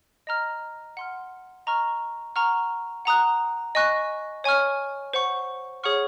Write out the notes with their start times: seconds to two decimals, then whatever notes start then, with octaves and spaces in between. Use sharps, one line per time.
0.27 D#5 A#5 F6
0.97 F#5 C6 F6
1.67 D#5 A#5 C#6 F6
2.36 F#5 A#5 C#6 F6
3.05 F#5 A#5 D#6 F#6
3.75 D#5 G#5 C#6 F#6
4.44 C#5 G#5 C#6 F6
5.14 C5 F#5 C#6
5.83 G#4 C#5 F#5 C#6 F6